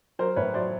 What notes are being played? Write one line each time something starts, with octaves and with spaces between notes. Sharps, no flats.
F#3 A#4 C5
A2 B4 C#5
F#3 C5 D5